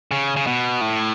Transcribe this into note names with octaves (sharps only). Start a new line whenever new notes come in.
C#3
C#3
B2
A2